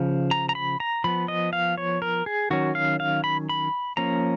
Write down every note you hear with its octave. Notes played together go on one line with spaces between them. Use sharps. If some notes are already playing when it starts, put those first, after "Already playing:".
Already playing: C#3 F3
A#5
A#5
B5
A#5
F3 B3 B5
D#5
F5
C#5
A#4
G#4
D#3 F#3 C#4 F#4
F5
F5
B5
B5
F3 A#3 C#4 A#5